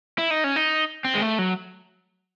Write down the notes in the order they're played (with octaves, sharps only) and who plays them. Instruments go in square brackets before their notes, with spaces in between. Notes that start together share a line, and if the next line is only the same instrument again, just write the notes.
[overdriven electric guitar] E4
D#4
C#4
D#4
C4
G#3
A3
F#3